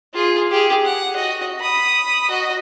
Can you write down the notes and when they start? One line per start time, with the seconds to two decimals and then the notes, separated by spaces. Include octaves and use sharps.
0.14 F4 G#4
0.51 G4 G#4
0.85 F#5
1.16 F#4 D#5
1.61 B5 D#6
2.30 F#4 D#5